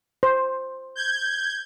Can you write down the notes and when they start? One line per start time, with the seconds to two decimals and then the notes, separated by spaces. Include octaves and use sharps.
0.23 C5
0.96 G6 G#6